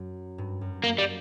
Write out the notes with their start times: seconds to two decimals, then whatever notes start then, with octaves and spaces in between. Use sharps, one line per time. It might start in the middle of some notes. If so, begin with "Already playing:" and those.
Already playing: F#2
0.38 G2
0.61 F#2
0.84 A#3
0.98 G3